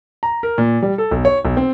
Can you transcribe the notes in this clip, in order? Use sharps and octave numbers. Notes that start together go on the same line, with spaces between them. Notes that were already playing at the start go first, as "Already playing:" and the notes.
A#5
A#4
A#2
G3
A4
B1
C#5
B1
C4